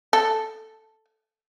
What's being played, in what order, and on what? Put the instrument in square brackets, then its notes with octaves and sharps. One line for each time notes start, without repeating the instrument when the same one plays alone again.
[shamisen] A4